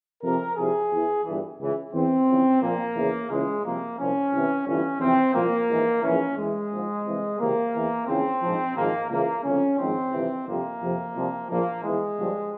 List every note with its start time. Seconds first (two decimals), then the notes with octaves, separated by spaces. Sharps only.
0.22 F2 C3 F3 A#4
0.56 C2 C3 F3 G#4
0.91 E2 E3
1.25 G1 G2 E3
1.59 C#2 C#3 E3
1.93 E2 E3 C4
2.28 E2 C#3 F3
2.61 A#1 A#2 F3 A#3
2.95 E2 C#3 E3
3.30 C#2 C#3 E3 G#3
3.63 C2 C3 F3 A#3
3.98 C2 A#2 F3 C#4
4.32 C2 C3 E3
4.66 G1 G2 E3 C#4
5.00 E2 C3 F3 C4
5.34 C2 A#2 F3 A#3
5.69 A#1 G#2 E3
6.02 A#1 G#2 E3 C#4
6.36 E2 E3 G#3
6.70 A#1 G#2 F3
7.05 C2 C3 E3
7.39 C#2 C3 E3 A#3
7.73 E2 E3
8.07 E2 C#3 F3 C4
8.41 A#1 G#2 F3
8.75 G#1 G#2 F3 A#3
9.09 C#2 C#3 E3 A#3
9.44 G1 F2 C#3 C#4
9.78 G#1 G#2 F3 C4
10.12 G1 F2 C3 E3
10.45 G1 F2 C3 F3 A#3
10.81 F2 C3 F3
11.14 C2 C3 F3
11.49 A#1 A#2 F3 A#3
11.82 E2 E3 G#3
12.16 G1 G2 F3